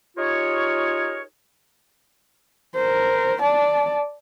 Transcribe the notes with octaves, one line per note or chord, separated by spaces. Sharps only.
D#4 F4 G4 G#4 A#4 C#5
A#4 C5
D5 A5